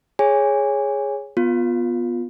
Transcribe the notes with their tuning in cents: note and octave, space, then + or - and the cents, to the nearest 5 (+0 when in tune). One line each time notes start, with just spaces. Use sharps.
G#4 +0 C#5 +0 G#5 -20
B3 -5 F4 +10